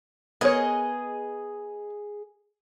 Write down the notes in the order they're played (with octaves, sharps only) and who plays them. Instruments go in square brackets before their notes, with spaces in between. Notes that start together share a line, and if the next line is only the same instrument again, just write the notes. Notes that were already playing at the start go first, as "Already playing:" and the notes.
[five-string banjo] B3 A#4 C#5 [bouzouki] G#4 D#5